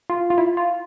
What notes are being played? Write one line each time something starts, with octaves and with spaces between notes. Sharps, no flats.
F4
F4
E4
F4